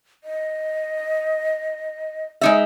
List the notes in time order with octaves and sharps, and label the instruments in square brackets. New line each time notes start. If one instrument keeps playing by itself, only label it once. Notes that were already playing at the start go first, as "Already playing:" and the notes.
[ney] D#5
[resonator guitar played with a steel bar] G#3 D#4 E5